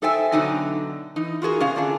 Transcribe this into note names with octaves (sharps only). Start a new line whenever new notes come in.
D#4 A4 C5 E5 G5 G#5
B2 D3 F#3 D#4 G5 G#5
E3 D#4
F4 F#4 G#4 A#4
C3 C#4 F5
D3 D4 F4 G#4